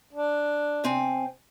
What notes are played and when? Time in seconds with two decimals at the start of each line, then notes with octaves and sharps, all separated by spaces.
0.13 D4
0.84 C3 C4 G#5